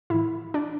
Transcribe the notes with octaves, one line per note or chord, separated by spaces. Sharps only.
A2 E3 E4
D4